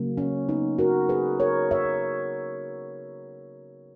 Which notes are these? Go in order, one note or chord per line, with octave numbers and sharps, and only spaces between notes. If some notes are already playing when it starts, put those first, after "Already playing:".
Already playing: C#3 F#3 A#3
C#4
B3 D#4
F#4 A#4
G#4 B4
A#4 C#5
C#5 E5